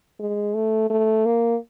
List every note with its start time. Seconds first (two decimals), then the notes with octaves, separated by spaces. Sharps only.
0.20 G#3
0.55 A3
0.90 A3
1.26 A#3